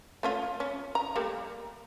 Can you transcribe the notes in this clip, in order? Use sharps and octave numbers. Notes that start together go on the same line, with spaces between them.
A3 C#4 F4
C#4
A#5
G3 A3 A#3